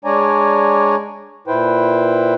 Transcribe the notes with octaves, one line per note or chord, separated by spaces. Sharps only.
G#3 D4 C#5 D5 G#5 A#5
A#2 E4 B4 C5 G5